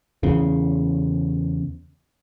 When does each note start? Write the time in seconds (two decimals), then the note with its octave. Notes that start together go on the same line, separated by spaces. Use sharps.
0.23 E2 C#3